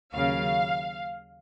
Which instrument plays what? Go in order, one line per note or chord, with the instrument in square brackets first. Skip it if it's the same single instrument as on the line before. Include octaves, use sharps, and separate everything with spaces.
[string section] D#2 C#3 F#3 F5